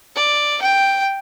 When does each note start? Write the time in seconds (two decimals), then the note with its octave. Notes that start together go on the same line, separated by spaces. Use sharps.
0.15 D5
0.61 G5